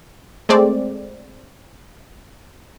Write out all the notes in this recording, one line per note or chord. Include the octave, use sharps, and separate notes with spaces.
G#3 A3 C4 D5